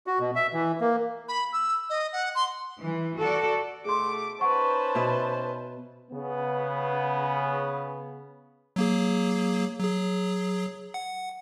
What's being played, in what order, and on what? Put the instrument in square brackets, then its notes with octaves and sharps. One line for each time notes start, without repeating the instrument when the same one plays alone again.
[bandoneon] F#4
B2
E5
E3
A#3
[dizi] B5
E6
D#5
F#5
C6
[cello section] E3
F#4 A4 D5
[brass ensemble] B2 A3 [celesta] G#4 C6 [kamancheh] D6
[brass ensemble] C#4 D#4 C5 [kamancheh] B4 A5 [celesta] F#5 C#6
[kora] B2 E5
[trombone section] C#3 B3
[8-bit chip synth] F#3 A#3 G#4
F#3 G#4
F#5